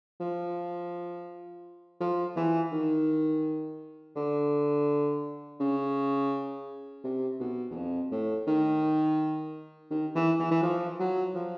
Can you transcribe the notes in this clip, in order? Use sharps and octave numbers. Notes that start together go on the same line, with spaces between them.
F3
F3
E3
D#3
D3
C#3
C3
B2
E2
F2
A2
D#3
D#3
E3
E3
E3
F3
F#3
F3